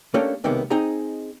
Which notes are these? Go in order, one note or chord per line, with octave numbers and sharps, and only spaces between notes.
A3 A#3 C#4 D4 G4 A4
B1 C3 D#3 G#3 A#3 B3
C4 D#4 G#4 D#5 G#5 A#5